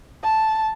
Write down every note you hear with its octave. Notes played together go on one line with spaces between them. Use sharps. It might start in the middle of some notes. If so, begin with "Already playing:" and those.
A5